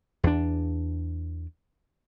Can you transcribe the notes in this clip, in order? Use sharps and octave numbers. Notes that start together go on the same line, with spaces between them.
E2 D4